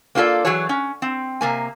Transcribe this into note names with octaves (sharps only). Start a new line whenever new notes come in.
A#3 C4 F4 F#4 A4 D5
E3 F#3 F#4 G#4 C#5
C#4
C4
C3 A#3 G#5